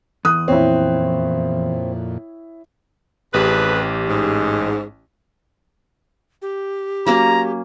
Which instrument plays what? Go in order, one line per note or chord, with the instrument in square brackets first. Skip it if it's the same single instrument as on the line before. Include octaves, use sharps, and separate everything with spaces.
[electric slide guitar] E2 [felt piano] D#6 F#6
[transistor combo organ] F2 A#2 [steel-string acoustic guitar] C4 [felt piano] E4 C#5
[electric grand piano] A1 G4 [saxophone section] F2 G#4 B4
[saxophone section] G#2
[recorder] G4
[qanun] F#3 A#3 C#4 [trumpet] A#5